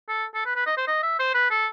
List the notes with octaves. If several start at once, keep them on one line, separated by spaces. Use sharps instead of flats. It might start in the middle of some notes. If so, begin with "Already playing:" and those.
A4
A4
B4
B4
D#5
C5
D#5
E5
C5
B4
A4